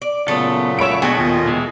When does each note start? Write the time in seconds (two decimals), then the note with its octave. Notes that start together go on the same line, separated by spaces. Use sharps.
0.02 D5
0.28 A#2 C#3 F#3 A3 B3 A4
0.79 C#2 C#5 E5 B5 D7
1.02 B2 G#3 A3 D4 F#4 G5 G#5
1.18 D#2 A#2 F4 D#5
1.47 E3 G#3